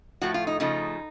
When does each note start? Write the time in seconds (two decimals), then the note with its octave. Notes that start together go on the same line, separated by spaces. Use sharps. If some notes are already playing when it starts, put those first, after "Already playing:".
0.21 A2 F3 A3 F#4
0.34 F4
0.47 D#4
0.60 C#3 F3 A3 D#4